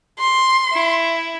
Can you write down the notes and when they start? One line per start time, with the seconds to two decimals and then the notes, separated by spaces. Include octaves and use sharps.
0.19 C6
0.73 E4